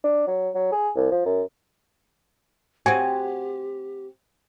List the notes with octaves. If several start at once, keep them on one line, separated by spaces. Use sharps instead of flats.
D4
F#3
F#3
G#4
C2
F3
F#2
C4 F#4 G4 G#5